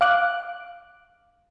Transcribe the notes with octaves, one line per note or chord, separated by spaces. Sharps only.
F5 D6 F#6